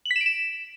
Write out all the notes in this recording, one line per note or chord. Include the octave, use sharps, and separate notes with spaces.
F#7
B6
E7
D7
E7